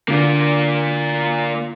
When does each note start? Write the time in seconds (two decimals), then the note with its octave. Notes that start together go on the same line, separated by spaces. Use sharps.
0.08 D3 A#3 F4